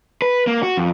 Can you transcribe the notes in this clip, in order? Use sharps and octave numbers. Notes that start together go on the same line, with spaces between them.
B4
A#3
F#4
F2